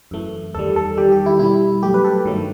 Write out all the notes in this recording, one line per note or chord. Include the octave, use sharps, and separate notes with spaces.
F#2 E3 A3
E2 D#3 G3 A4
A4
E2 D#3 G3 G4
G4
E4
B2 G3 E4
F#2 F#3 A3 G4
B4
A4
G2 D#3 F#3 A3